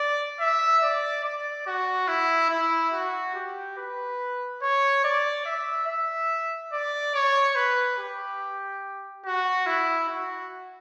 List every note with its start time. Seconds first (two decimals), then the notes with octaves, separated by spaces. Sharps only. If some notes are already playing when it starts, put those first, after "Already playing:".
Already playing: D5
0.40 E5
0.83 D5
1.24 D5
1.67 F#4
2.08 E4
2.50 E4
2.93 F#4
3.35 G4
3.77 B4
4.62 C#5
5.04 D5
5.45 E5
5.87 E5
6.72 D5
7.15 C#5
7.56 B4
7.98 G4
9.25 F#4
9.66 E4
10.09 F#4